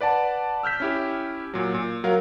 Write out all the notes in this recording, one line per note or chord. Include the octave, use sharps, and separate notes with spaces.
B4 D5 F#5 A5
E6 F6 G6 B6
C#4 E4 G4
A#2 F#3
A#2
F#3 A#4 F5